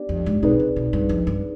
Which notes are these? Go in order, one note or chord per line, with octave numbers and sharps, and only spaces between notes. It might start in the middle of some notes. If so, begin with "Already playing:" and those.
Already playing: B3 D4 G4 D5
F2
G#2
B2 C4 D#4 G#4 B4 D5
C3
B2
G2
F2
G2